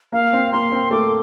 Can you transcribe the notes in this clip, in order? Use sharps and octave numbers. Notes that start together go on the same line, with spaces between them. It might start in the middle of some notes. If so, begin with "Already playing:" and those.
A#3 F5
C4
A#3 C6
C4
A3 D6